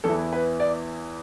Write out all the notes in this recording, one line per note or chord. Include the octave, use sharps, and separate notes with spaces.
E2 E3 B3 E4 A4
B4
D5